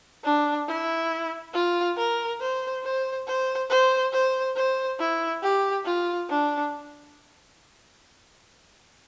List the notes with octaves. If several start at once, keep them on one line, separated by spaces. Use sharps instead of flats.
D4
E4
F4
A#4
C5
C5
C5
C5
C5
C5
E4
G4
F4
D4